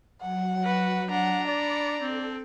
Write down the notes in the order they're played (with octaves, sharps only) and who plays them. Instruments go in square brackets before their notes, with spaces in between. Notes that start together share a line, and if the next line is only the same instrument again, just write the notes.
[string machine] F#3 [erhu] F#5
[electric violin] F#4 B4
[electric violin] D4 A#5 [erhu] F#5
[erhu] D5 [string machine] B5 D6 C#7
[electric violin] C4 [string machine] A4